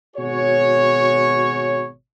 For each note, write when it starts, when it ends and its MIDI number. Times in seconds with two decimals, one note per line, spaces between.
0.17 1.89 32
0.17 1.89 47
0.17 1.89 66
0.17 1.89 68
0.17 1.89 73